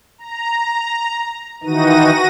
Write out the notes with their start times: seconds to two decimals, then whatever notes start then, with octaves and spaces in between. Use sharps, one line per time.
0.18 A#5
1.63 D#3 E3 D#4 F#4 A#6 D#7